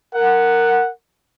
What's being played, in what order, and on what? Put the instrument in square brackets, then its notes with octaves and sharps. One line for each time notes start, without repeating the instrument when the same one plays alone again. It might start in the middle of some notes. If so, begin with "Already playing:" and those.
[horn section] A#4 F#5